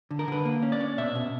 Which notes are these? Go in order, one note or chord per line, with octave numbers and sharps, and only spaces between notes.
D3
A#4
D3 B4
A#3
C#4
D5
C#4
B2 E5
B2